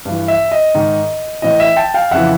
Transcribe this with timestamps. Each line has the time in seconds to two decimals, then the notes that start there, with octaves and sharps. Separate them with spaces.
0.05 G2 E3
0.28 E5
0.52 D#5
0.74 G#2 D#3
1.42 A2 E3 D#5
1.60 E5
1.77 G5 A5
1.94 F5 G5
2.11 F2 C#3 E3 E5 F#5